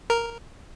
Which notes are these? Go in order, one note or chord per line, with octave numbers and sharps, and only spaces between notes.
A#4